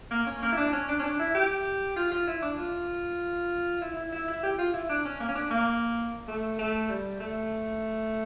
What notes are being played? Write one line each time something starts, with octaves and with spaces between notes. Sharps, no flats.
A#3
C#4
A#3
E4
D4
C#4
D4
C#4
D4
E4
G4
F4
F4
E4
D4
F4
E4
E4
E4
E4
G4
F4
E4
D4
C#4
A#3
C#4
D4
A#3
A3
A3
G3
A3